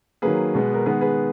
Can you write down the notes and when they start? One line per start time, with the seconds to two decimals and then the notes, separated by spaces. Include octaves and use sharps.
0.22 D#3 F#3 A#3 G#4 B4
0.55 B2 G#3 B3
0.74 A#4
0.86 D#3 G#3 B3 G#4 B4
1.01 G#4 B4